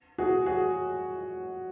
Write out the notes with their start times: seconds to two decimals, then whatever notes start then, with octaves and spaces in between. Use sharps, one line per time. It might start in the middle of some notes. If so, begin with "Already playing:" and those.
0.18 F#4 G#4
0.46 F#4 G#4